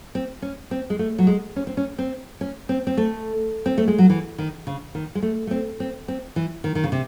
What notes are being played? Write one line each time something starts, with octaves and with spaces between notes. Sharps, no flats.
C4
C#4
C4
G#3
A3
F#3
G#3
C#4
C4
C#4
C4
C#4
C4
C4
A3
C4
A3
G#3
F#3
E3
D#3
C#3
D#3
G#3
A3
A3
C4
C4
C4
E3
D#3
D#3
C#3
C3